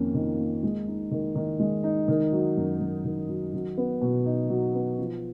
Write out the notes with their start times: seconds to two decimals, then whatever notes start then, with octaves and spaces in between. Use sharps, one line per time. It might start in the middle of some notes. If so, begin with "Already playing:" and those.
Already playing: F2 D#3 A#3 C#4
0.14 D#3
0.39 A#3
0.63 G#3
0.88 D#4
1.11 D#3
1.35 D#3
1.60 G#3
1.84 D#4
2.08 D#3
2.32 F#3
2.57 F#2
2.81 F#2
3.05 D#3
3.29 F#3
3.54 F#3
3.78 B3
4.02 B2
4.25 D#4
4.50 F#3
4.75 B3
4.99 F3